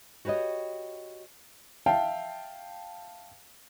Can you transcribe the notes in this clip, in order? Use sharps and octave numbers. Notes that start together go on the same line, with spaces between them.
F#4 G4 B4 C#5 D#5
E5 F5 G5 A5